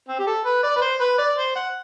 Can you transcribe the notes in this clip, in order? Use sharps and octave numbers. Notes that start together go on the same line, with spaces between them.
C4
G4
A4
B4
D5
B4
C5
B4
D5
C5
F#5